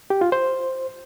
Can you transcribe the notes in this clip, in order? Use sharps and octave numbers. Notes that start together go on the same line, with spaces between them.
G4
F4
C5